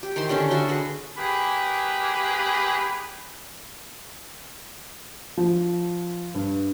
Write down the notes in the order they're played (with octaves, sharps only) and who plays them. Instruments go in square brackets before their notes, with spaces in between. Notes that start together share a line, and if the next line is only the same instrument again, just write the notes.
[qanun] G4
D#3 E3 C5 C6
D3 C#4 D4 G4
D4 F#4 E5 C6
G#4 B4 F#5
[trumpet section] A#3 G4 G#4 B4 B5
[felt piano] F3
G2